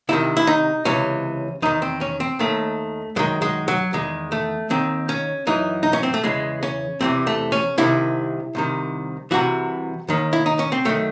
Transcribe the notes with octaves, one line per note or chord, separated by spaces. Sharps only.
C2 C3 D#3 E4
E4
D#4
C#2 C3 E3 C#4
E2 D#3 D#4
C4
C#4
C4
D#2 D#3 A3
F#2 D#3 G#3
G#3
F#3
E2 D#3 G#3
A3
D#2 D#3 C4
C#4
F#2 E3 D#4
D#4
C#4
C4
A3
E2 C#3 E3 G#3
C#4
E2 C3 E3 C4
A3
C#4
C2 C3 D#3 E4
C2 C3 D#3
C2 C3 E3 F#4
D#2 D#3
E4
D#4
C#4
C4
F#2 D#3 A3